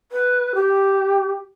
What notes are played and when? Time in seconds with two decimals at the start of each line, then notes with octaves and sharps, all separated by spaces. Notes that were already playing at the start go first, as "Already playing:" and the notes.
0.12 B4
0.55 G4